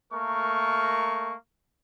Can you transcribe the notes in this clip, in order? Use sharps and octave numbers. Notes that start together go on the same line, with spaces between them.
A3 A#3 A#4 C#6